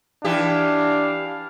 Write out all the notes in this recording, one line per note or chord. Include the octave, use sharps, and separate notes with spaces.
E3 D4 G4 F5